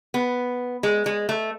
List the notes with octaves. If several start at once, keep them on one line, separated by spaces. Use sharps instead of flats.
B3
G#3
G#3
A3